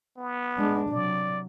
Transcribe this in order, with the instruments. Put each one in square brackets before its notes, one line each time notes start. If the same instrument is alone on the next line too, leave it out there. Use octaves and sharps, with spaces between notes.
[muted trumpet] B3
[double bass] G#3 D4
[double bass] C3 F#3 [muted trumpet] D5